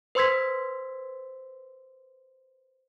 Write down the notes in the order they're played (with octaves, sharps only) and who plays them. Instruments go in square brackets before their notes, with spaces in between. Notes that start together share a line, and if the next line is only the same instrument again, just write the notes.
[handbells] B4 C5 C6 E6 G#6 B6